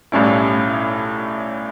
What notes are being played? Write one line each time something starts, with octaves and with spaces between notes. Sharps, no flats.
B1 A2 G3 C#4 E4